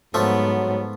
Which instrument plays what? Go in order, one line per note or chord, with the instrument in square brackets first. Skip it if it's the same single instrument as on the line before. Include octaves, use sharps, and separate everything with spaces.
[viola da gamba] G#2 B3 [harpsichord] F3 A3 [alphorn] F#3